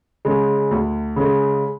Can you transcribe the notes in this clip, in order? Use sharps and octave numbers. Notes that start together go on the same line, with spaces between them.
C#3 G#3
D2
C#3 G#3